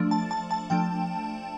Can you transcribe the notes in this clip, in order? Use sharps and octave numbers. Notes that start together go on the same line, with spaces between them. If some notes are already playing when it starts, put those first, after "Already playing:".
Already playing: F3 A3 D4
A5
A5
A5
F3 A3 D4 G5